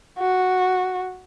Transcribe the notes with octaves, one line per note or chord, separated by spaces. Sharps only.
F#4